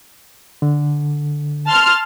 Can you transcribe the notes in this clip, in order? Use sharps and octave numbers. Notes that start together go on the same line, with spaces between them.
D3
A5 C6 F6